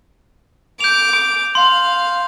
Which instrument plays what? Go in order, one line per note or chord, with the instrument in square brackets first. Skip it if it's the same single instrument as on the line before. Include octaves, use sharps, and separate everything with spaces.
[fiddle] D6 [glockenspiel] G6 F7
[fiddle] F5 [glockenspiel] C6